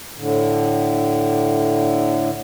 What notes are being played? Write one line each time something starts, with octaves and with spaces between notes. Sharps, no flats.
A2 D3